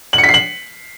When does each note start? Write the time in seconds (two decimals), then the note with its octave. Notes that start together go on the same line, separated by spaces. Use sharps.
0.13 F#7
0.18 C#7
0.23 B6
0.29 C7
0.34 F#7